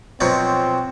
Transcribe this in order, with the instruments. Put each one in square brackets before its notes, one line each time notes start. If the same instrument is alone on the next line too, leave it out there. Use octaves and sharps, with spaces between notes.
[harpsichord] B2 F3 F#3 [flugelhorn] C4